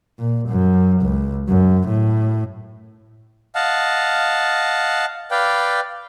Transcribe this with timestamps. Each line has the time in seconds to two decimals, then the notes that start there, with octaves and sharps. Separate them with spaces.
0.19 A#2
0.48 F#2
1.02 C#2
1.49 F#2
1.87 A2
3.55 D#5 F5 F#5 A5
5.31 B4 D5 F5 G5